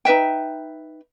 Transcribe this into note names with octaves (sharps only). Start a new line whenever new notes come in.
D#4 B4 E5 G5